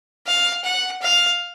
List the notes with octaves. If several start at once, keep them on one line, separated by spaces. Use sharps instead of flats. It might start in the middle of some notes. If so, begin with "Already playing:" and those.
F5
F#5
F5